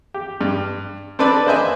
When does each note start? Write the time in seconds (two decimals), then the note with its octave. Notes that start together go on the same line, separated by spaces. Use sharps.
0.14 G4
0.41 G2
1.19 C4 D4 A4 B4 D5
1.46 A#3 B4 C5 D#5 E5 G#5